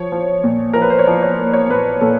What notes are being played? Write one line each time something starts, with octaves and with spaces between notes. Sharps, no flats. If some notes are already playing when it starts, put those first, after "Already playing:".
Already playing: F3 C#5
F3
A#2
F3 A#4
B4
C5
C#5
F3 D5
C#5
A#3
C#5
A#2 B4
A#2 A4